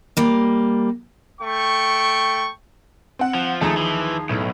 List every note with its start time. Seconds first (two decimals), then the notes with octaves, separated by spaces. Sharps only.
0.17 G3 A#3
1.40 A3 G5 C#6
3.19 C4 F#5
3.34 F3
3.61 D#2 F3 A3 G#4 A#5
3.77 E3
4.30 B1 A2